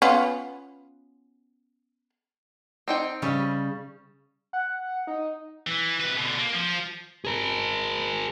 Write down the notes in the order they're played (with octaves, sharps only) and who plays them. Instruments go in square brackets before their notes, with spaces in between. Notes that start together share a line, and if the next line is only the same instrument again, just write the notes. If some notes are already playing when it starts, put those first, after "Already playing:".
[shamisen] B3 C#4 F4
[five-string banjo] C4 D#4 G5
[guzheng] C#3 G3 C#4
[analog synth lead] F#5
D#4
[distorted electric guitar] E3
C3 B4
B2 D3
A#3
F3
[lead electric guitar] G#4 A#4